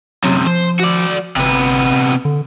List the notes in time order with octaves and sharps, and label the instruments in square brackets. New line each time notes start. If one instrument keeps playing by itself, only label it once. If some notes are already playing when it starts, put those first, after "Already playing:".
[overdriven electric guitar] F#2 C3 [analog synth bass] F#3
[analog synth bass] F3 [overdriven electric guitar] C5
[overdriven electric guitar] F#4 D5
[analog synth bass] G1 [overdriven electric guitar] C3 B3
[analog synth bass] D3